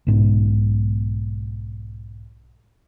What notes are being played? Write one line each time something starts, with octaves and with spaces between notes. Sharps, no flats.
B1 G#2 B2